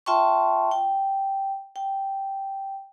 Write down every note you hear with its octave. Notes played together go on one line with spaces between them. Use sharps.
F4 E5 G5 A5 C6 C#6
G5
G5